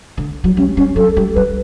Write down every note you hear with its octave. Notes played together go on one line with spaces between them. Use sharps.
D3
F#3
G3 C#4
G3 C#4
F#3 A4
G3
G3 B4